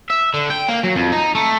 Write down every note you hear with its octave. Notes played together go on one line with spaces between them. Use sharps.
E5
D3
G5
A#3
F#3
F2
D#4
A3